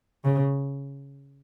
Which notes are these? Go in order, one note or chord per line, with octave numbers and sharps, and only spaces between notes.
C#3